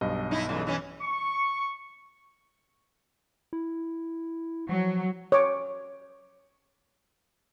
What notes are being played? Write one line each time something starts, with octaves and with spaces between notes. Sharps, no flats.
B1 G2 D#5
D#4 E4
A2 C#3 E3
E3 C#4
C#6
E4
F3 F#3
C#5 D6